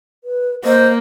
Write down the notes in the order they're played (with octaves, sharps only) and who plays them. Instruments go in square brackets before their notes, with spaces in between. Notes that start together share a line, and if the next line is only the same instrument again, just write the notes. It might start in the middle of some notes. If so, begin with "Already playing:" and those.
[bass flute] B4
[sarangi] A#3 [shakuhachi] C5 [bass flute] D#5